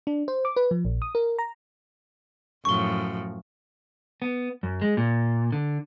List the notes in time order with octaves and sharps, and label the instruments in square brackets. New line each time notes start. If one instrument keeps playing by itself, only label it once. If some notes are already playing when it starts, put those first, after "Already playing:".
[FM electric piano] D4
C5
D6
B4
F3
A#1
D#6
A#4
A#5
[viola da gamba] F#2 A2 F3 [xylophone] C#6 G7
[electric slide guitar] B3
F#2
G#3
A#2
D3